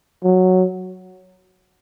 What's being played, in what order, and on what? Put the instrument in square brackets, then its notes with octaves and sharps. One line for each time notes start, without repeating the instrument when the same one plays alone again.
[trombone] F#3